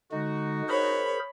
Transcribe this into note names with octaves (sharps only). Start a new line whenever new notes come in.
D3 G#3 D#4 F#4
G#4 A#4 C5 C#5 B5